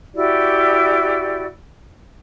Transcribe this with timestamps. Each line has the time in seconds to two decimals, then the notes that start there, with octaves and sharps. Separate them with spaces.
0.15 E4 F#4 G4 D5